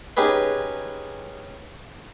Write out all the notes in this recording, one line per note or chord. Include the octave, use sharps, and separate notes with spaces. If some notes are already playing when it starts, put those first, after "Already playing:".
C#4 D#4 G4 G#4 B4